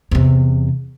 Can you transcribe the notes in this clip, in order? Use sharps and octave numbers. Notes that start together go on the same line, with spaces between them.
E2 C3